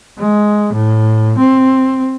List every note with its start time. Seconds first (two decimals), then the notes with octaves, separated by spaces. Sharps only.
0.18 G#3
0.73 A2
1.38 C4